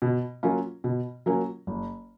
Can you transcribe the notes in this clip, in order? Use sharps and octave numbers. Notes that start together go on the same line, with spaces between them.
B2
F#3 A#3 C#4 F4
B2
F#3 A#3 C#4 F4
F#1